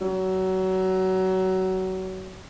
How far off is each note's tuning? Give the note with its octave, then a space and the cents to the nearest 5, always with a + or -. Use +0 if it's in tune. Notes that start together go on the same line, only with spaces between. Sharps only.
F#3 +25